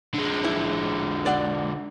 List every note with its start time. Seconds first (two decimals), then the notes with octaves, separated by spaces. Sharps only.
0.14 D3 G#3
0.44 E4
1.26 D5 F#5